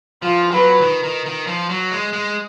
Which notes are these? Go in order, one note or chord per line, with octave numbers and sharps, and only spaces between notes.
F3 F4
F#3 B4
D#3
D#3
D#3
F3
F#3
G#3
G#3